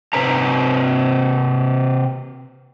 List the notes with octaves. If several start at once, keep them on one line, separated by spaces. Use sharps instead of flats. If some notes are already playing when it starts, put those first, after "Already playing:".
C3 C4 B4 C#5 A#5